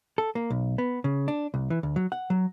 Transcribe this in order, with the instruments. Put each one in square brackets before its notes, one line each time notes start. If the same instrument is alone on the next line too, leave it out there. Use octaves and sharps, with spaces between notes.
[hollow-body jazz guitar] A4
A#3
B1
B3
C#3
D4
C2
E3
D2
F#3
F#5
F#3